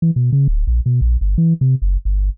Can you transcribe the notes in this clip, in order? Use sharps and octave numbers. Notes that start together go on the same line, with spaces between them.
E3
B2
C#3
D1
A#1
B2
A#1
G1
E3
C3
F#1
G1